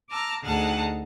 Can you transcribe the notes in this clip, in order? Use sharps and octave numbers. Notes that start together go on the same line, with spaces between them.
A5 A#5 D6 E6 F6
D2 D#4 G#4 F#5 A5 F6